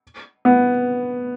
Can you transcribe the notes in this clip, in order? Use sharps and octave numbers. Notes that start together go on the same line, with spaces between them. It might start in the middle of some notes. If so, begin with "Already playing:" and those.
B3